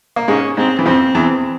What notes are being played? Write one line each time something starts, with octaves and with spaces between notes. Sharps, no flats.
A#3
G#2 G#3 C#4
G#2 G#3 C4
E3
F2 F3 C4
E2 E3